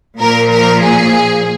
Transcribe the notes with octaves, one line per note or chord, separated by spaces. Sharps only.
A#2 F3 A#4
A#4
G#4